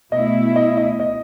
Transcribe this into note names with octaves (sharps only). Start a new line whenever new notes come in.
B2 A3 E4 D#5
D#5
D#5
D#5